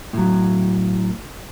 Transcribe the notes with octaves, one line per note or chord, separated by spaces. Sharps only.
A2 F#3